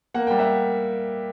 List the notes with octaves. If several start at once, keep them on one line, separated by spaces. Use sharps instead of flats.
A#3 F#5
G3 G5
E5 F#5